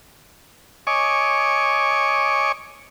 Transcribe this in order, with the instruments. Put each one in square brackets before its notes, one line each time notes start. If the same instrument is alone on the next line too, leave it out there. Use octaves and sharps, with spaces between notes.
[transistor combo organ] C#5 D#5 G#5 C#6 D6